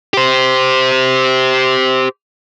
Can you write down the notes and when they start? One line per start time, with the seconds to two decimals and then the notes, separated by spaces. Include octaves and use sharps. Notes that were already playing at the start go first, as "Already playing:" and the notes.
0.14 G4 C5